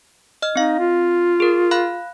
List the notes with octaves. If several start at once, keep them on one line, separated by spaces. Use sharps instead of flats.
D#5 F6
C4 D#4 F5
F4
G#4 A#4
F5 B5 F#6